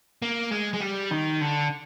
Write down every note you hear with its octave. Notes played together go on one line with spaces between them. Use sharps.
A#3
G#3
G#3
G3
D#3
D3